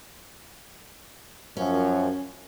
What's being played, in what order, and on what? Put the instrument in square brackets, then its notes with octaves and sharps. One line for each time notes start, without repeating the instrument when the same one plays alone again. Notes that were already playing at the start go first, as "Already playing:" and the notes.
[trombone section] F#2 F3 [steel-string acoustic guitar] C#4